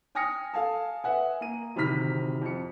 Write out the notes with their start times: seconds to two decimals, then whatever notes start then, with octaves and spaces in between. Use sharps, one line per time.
0.15 G5 G#5 D#6 F6 A#6 C#7
0.54 A4 F5 G#5 A5
1.04 B4 E5 F#5 G#5
1.41 A#3 D#7
1.76 D1 C3 D#3 B5 F6 B6
2.41 F2 C#7